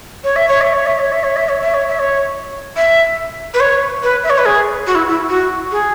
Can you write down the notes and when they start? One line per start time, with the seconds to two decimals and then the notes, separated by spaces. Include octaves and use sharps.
0.24 C#5
0.36 E5
0.48 C#5
0.61 E5
0.74 C#5
0.86 E5
0.99 C#5
1.12 E5
1.23 C#5
1.36 E5
1.49 C#5
1.61 E5
1.74 C#5
1.88 E5
1.99 C#5
2.76 E5
3.54 B4
3.60 C#5
4.03 B4
4.24 E5
4.30 C#5
4.38 B4
4.45 G#4
4.87 F#4
4.95 E4
5.08 E4
5.29 F#4
5.71 G#4